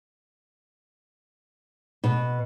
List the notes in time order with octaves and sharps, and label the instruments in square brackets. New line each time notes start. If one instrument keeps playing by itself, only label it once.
[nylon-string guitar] B2